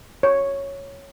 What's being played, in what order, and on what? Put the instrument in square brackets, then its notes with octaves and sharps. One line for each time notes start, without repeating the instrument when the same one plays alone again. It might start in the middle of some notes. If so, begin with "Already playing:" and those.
[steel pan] C#5